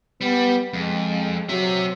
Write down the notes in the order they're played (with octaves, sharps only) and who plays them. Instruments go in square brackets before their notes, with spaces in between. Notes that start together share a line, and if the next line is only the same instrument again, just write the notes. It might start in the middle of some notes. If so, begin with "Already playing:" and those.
[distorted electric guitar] G3 [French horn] B3
[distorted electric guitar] F2 [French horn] G#3
[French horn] F#3 [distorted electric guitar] C4 E5